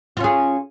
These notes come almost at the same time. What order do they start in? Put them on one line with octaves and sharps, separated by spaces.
F4 C#4 G#4